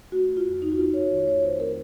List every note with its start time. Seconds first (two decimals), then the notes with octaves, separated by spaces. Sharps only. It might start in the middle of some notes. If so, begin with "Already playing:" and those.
0.12 A3 F#4
0.29 A3
0.37 F4
0.45 F2
0.61 F2 D#4
0.72 F#4
0.77 F2 F4
0.94 F2 C#5
1.10 D#3 C#5
1.26 A3 C#5
1.43 C4 C5
1.59 A3 A#4